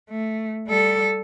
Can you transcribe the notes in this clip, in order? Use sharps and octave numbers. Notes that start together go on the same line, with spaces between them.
A3
G3 A4